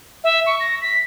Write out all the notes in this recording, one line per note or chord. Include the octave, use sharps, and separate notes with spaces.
E5
C#6
A#6
B6